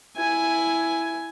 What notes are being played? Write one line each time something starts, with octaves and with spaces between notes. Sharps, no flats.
E4 G#5